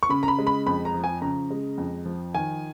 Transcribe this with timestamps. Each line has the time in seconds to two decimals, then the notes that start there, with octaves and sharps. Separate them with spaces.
0.03 C#6
0.09 C#3 B5
0.23 A#5
0.28 B5
0.39 G#3
0.47 B5
0.67 F2 B5
0.85 A#5
0.94 F3
1.04 G#5
1.21 C#3 A#5
1.51 G#3
1.78 F2
2.06 F3
2.35 D#3 G#5